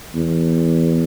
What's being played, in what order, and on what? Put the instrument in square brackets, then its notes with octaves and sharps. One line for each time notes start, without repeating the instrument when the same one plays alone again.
[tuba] E2